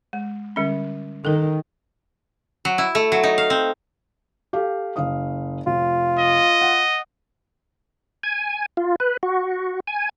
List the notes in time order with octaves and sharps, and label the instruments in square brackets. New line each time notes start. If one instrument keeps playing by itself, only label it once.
[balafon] G#3
D3 G3 C#4
[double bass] D#3 [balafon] A4 A#4
[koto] F#3
E4
A3
F#3
D#4
F5
C4
[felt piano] G4 A4 F5
F#1 F5 D#6
[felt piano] F1 [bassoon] F4
[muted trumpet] D#5
[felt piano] F#5
[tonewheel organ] G#5
F4
B4
F#4
G#5